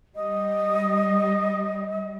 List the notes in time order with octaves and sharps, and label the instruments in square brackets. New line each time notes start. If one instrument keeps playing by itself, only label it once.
[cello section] G3 [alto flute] D#5